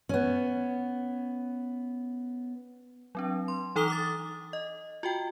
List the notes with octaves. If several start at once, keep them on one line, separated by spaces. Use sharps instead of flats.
B3 C#4
F#3 C4 D4
C6
E3 D#4 A4 A#5 D#6 G7
D6 D#6 A6
D#5
F4 F#4 G5